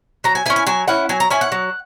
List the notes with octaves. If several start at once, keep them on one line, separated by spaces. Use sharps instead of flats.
F#3 A#5
G#5
C#4 E4 G#5
G#5
F#3 G#5
C#4 E4 F#5
F#3 G#5
A#5
C#4 E4 G#5
F#5
F#3